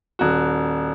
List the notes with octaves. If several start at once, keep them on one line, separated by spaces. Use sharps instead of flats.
D#1 F#4